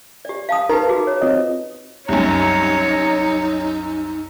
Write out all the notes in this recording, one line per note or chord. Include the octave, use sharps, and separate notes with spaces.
G4 D5
F5 A5 D#6
D#4 G4 A#4 B4
F#4 G#4
C#5
C4 F4 D#5
C2 F#2 D#4 C#5 A#5